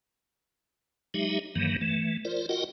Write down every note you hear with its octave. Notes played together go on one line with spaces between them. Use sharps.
F#3 G#3 D#4 G4 E5
G2 D#3 E3 F#3 A#3
E3 A3
F4 A#4 C5 D5
F4 F#4 A#4 D#5 F#5 G5